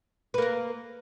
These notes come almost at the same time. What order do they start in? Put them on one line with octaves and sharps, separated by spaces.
B4 A#3 A#4